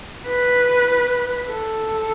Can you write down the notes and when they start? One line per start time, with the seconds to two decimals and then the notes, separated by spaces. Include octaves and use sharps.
0.25 B4
1.49 A4